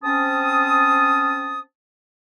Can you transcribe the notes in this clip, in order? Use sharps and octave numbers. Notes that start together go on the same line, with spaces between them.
C4 C#4 A5 D#6